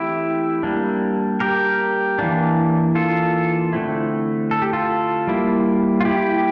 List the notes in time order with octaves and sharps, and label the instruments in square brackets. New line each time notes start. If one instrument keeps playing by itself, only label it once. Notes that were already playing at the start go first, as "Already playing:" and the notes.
Already playing: [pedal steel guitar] E3 A3 C4 E4 G4
G3 A#3 D4
G4 A#4
E3 A#3 D4
F4 A4
D3 A3 C4 E4
A4
G4
F4 A4
G3 A#3 E4
F4
E4 G4